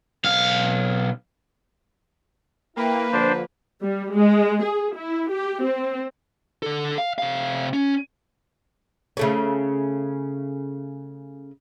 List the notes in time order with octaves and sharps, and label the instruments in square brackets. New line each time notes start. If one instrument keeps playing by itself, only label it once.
[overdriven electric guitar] B1 F5
[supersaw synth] A#3 [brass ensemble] E4 G5 [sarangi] B4
[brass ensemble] D3 F3 [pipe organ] D4 C5
[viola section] G3
G#3
G#4
E4
G4
C4
[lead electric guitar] D3 A4
F5
C3 F5
C#4
[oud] C#3 A3 C#4